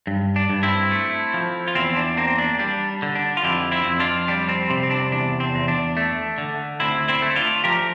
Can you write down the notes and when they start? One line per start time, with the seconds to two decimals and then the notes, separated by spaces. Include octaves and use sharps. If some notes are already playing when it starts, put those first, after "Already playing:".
0.07 G2
0.36 D4
0.50 G2
0.63 C4 E4
0.91 A3
1.34 F3
1.68 F4
1.75 E2 C4 E4
1.97 D4
2.17 A#3 C4
2.38 D4
2.59 G3 D4
3.02 D3
3.15 D4
3.37 F4
3.43 F2 E4 G4
3.71 C4 E4
3.86 F2
3.99 D4 F4
4.28 G3 D4
4.49 C4
4.70 C3 C4
4.83 C4
4.91 D4
5.11 E2 D4
5.40 C4
5.55 E2
5.68 D4
5.97 A3
6.38 D3
6.80 D2 C4 E4
7.08 C4 E4
7.22 A3
7.30 E4
7.36 D4 F4
7.64 F3 G4 A#4